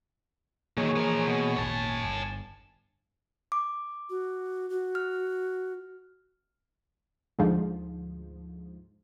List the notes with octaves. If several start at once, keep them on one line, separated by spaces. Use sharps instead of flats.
D#3 E3 F#3 A#3 G#4 C#5
F3 A#4
B2
G#1 D#2 A#2 C#5 G#5 A5
G1
D6
F#4
F#4
F6
D2 G#2 F3